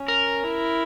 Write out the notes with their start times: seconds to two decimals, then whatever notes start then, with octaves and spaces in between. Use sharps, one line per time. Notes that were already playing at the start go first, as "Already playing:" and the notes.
Already playing: C#4
0.08 A#4
0.43 E4